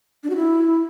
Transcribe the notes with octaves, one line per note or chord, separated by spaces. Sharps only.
D4
F#4
E4